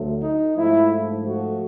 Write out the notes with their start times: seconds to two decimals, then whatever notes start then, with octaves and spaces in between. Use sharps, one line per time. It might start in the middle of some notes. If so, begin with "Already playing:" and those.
Already playing: D2 D3 F#3 A3
0.21 D#4
0.56 G#2 F3 A3 E4
1.25 F#4